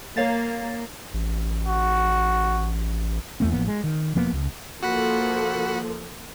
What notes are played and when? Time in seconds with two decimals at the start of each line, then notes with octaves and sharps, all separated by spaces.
0.17 A#3 C#5 F5 A6
1.14 A1
1.67 F#4
3.40 E2 A3 C4
3.52 A1 F3 A#3 B3
3.68 G#3
3.84 D#3
4.15 E1 F3 A#3 B3
4.32 C#2
4.83 F3 A#3 F#4 A4 F#5 B5